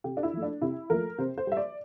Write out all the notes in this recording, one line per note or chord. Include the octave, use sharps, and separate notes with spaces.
C3 G4
D4
E4
F3 A3
D4
C3 E4
F3 A3 A#4
C3 C5
C5
G3 E5
D5